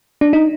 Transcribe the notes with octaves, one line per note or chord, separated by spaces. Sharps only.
D4
D#4